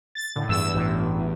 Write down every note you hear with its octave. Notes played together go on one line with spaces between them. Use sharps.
A6
A2 D3
E2 G2 E6
A1